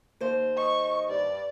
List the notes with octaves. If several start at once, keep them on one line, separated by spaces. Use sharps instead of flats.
D#2 C5
D#5 C#6
G2 D5